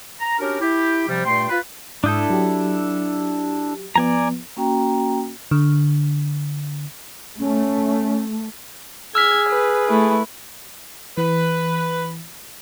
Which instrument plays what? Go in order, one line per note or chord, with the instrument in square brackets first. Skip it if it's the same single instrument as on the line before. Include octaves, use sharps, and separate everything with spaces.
[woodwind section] A#5
C#4 D4 F#4 G4 A#4
E4 G4
C3 F3 G3
G2 A#2 A3 G5 C6
F4 B4
[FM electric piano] G#2 D#6 G6 [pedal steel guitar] D4 E4 A4
[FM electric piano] F#3 G4
[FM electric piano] F3 B3 [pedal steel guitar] D5 G#5 A#5
[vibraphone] A#3 C#4 F#4 G5 A#5
[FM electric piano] D3
[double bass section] A3 [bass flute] C#4
[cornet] G#4 [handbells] E6 F6 B6 [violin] G#6
[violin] B4
[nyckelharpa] A3 E4
[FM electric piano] E3 [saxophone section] B4